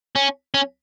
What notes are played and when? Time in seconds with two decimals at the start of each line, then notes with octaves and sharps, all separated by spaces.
0.16 C#4
0.54 C#4